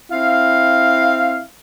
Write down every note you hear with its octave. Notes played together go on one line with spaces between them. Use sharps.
C4 E4 F5